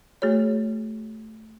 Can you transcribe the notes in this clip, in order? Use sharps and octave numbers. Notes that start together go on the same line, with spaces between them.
A3 F#4 G#4 C#5